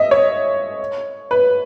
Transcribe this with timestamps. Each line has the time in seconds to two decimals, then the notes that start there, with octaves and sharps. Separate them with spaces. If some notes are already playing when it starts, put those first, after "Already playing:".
Already playing: D#5 E5
0.11 C#5
1.31 B4